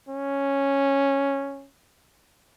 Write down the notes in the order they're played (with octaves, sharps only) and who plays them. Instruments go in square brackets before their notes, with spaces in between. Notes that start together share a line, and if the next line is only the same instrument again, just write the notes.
[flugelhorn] C#4